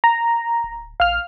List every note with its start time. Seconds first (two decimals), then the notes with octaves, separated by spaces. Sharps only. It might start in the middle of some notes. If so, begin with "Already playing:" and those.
0.04 A#5
0.64 D1
1.00 A#1 F5 F6